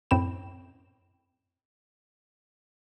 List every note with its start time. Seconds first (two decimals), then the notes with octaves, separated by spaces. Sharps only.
0.11 F#2 A2 C4 G5 B5 E7